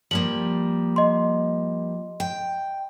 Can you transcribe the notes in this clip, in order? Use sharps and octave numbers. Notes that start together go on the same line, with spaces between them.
F3 G3 A#3 F#7
D#5 C6
G5